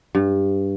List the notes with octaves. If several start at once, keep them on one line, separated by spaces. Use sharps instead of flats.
G2